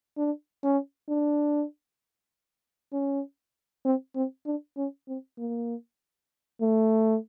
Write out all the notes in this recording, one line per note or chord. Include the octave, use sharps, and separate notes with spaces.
D4
C#4
D4
C#4
C4
C4
D4
C#4
C4
A#3
A3